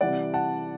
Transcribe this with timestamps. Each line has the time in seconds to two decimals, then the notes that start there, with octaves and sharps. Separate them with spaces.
0.01 C3 E3 G3 D5 F#5
0.34 F#5 A5